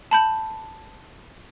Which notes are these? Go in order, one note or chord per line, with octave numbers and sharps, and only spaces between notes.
A5 B5 G6